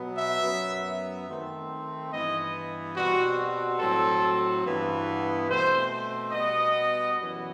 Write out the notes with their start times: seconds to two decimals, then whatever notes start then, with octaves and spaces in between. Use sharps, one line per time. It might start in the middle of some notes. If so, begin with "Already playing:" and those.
Already playing: B2 F#3 B3
0.14 E5
0.42 F#2 F#3 B3
1.27 D#3 A3 C4
2.10 G2 E3 B3 D#5
2.95 B2 G3 C4 F#4
3.79 A2 F#3 C4 A4
4.64 G2 E3 B3
5.49 B2 A3 C4 C5
6.32 B2 G3 B3 D#5
7.17 F#2 E3 B3